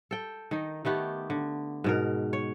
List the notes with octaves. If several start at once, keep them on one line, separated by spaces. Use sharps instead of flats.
A4 G5
D#3 D#4
D#3 A3 B3 G4
D3
G#2 B2 A#4
C#5